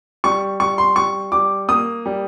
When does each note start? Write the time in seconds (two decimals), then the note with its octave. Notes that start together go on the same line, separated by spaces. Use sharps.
0.24 G3 C#6
0.60 G3 C#6
0.78 C6
0.96 G3 C#6
1.32 G3 D6
1.68 A#3 D#6
2.06 G3